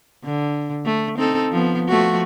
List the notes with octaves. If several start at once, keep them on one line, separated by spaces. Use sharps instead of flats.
D3
A3
C4 D#4 A4
F3 B3
F3 A3 F#4